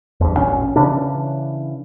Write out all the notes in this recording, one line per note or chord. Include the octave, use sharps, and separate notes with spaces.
E2 G2
A1 A#2 C#4
C#3 E3 C#4 D4